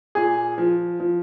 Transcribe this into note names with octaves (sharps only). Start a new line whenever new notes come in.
A#2 G#4
F3
F3